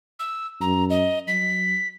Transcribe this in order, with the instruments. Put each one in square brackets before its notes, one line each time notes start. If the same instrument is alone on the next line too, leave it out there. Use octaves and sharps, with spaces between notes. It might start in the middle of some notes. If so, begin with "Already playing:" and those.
[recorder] E6
[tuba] F#2 [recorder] A#5
[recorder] D#5
[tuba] F#3 [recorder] B6